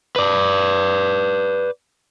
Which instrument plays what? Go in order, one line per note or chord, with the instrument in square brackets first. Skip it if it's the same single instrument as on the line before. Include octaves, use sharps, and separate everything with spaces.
[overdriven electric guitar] B4 D5